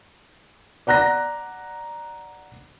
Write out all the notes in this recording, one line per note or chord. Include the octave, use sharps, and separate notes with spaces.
D5 F#5 A#5 F#6 A#6